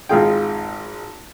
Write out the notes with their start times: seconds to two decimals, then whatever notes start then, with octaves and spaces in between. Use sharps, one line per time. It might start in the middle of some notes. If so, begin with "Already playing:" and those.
0.09 G#1 G#3 D#4 F4 G#4 G5